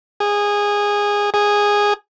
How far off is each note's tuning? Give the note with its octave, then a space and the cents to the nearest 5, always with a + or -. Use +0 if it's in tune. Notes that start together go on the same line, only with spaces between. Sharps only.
G#4 -15
G#4 -10